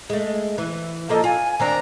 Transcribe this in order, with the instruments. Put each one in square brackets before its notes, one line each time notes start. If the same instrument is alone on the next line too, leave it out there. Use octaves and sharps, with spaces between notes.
[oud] G#3 A3
E3
[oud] F3 A#3 D#5 [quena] A4
[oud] F4 [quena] G#5
[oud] D#3 C4 D4 [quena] A#5